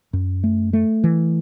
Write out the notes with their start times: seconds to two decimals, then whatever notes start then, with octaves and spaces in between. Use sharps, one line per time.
0.13 F#2
0.44 A3
0.73 A3
1.04 E3